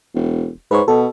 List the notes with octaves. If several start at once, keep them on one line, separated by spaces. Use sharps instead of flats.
E1
G#2 B4 C#5
B2 A4